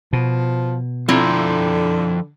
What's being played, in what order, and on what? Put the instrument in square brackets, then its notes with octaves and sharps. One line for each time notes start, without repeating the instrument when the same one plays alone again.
[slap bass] B2 [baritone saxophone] F3
[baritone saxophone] D3 [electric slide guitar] F3 A4 A#5 [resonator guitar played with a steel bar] C4 E4 F4